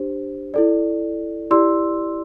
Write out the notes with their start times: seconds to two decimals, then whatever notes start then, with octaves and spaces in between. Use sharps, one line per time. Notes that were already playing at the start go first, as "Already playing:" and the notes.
Already playing: D4 G4 C5
0.54 E4 A4 D5
1.51 E4 G4 D5 C6 E6